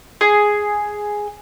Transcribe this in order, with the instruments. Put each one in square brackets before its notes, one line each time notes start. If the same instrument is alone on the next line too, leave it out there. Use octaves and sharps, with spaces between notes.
[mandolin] G#4